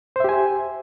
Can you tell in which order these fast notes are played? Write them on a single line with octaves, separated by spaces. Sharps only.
C5 E5 G4 G#5